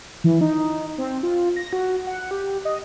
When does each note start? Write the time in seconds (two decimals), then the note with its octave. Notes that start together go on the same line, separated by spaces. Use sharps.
0.24 E3
0.41 D#4
0.98 C4
1.23 F4
1.56 A#6
1.73 F#4
2.07 F#5
2.31 G4
2.65 D#5